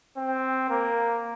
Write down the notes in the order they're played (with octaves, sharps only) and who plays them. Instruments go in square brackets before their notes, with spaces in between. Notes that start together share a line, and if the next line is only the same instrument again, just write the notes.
[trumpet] C4
A#3